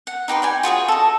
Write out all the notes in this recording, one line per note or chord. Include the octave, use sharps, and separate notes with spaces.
F#5
D#4 G4 B4 C6
D5 G5 G#5
F4 F#4 G#4 C#5
A4 D#5